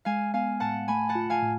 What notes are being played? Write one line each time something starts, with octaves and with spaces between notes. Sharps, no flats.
G#3 F5 G#5
B3 F5 G#5
A2 F#5 A5
A3 G#5 B5
F#5 A5
F4
F5 G#5
A2